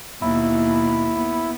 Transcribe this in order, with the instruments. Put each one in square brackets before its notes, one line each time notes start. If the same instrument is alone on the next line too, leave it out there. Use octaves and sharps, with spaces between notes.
[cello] D#2 B2 [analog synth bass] E4
[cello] B3